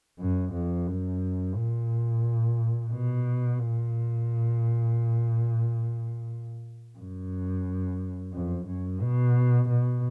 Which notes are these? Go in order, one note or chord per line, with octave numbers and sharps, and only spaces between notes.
F#2
F2
F#2
A#2
B2
A#2
F#2
F2
F#2
B2
B2